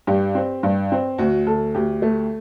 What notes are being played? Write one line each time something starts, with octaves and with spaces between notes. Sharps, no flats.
G2 G4
C4
G2
C4
D2 F#4
D2 A4
D2 G4
A3